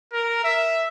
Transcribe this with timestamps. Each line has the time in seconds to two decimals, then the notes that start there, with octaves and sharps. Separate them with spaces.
0.13 A#4
0.44 E5